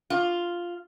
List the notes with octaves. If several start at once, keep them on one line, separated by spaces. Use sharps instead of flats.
F4